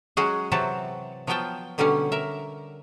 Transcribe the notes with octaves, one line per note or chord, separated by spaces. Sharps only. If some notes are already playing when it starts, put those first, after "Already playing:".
F#3 G#3 C#4 F#4 G#4
C3 E3 F#3 C4 F#4 A5
F3 F#3 B3 F4 G5 A5
B2 D3 F#3 G3 C#4
A#4 E5